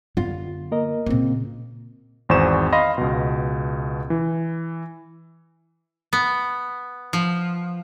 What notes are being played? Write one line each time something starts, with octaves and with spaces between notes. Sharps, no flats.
F#2 D3 B3 F4
A#3 A#4 D#5
A#2 C#3 A#3 C4
G#1 E2 C5 D5 C#6 E7
D#5 F5 B5 C6 A#6 B6
C#2 B2
E3
B3
F3